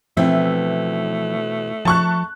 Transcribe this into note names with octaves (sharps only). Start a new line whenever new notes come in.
B2 E3 F3 A3 C4 E5
F3 A5 C#6 F#6